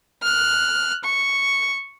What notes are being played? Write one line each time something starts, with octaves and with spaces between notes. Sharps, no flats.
F6 F#6
C#6